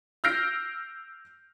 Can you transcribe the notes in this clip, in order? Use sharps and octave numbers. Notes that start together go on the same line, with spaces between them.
E6 F6 G6 A#6 C7 D7